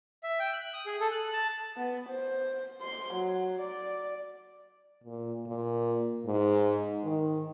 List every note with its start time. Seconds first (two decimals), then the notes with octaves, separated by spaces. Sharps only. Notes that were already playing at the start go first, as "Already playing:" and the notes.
0.23 E5
0.39 G5
0.53 F#6
0.74 D#6
0.86 G#4
1.00 A4
1.12 F#6
1.33 A5
1.77 B3
2.10 C5
2.81 C6
3.14 F#3
3.61 D5
5.04 A#2
5.46 A#2
6.26 G#2
7.04 D#3